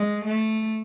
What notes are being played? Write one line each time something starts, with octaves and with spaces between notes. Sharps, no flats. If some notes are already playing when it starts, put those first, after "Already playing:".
Already playing: G#3
A3